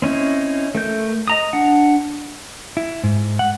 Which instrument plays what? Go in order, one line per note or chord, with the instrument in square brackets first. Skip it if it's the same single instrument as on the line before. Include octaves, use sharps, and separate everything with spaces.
[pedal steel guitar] C4 C#4 D#4 E4
A3 A#4 G6
D#5 A#5 D#6
D4 F#5
[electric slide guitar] E4
G#2
F#5